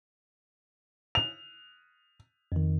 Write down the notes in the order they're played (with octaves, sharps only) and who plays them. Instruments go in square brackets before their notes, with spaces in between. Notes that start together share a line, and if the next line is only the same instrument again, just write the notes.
[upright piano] F7
[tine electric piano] F2 D#3